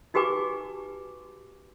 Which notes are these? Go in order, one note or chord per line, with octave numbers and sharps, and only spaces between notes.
D#4 F#4 G4 B4 G#5 D6